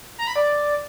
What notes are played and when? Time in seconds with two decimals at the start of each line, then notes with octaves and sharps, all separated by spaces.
0.18 A#5
0.27 B5
0.36 D5